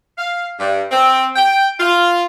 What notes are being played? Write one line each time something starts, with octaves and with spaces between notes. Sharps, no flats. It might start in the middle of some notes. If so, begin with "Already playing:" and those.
F5
G2
C4
G5
F4